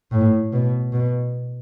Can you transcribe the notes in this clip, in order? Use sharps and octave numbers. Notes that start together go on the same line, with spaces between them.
A2
B2
B2